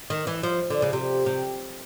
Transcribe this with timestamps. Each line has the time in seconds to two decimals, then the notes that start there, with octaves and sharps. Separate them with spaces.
0.10 D#3
0.27 E3
0.43 F3
0.70 D3
0.82 C#3
0.93 C3
1.26 C3